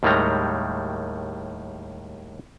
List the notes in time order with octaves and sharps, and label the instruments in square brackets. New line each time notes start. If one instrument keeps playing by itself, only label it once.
[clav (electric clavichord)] D#2 A2 D#3 G3 G#3 A#5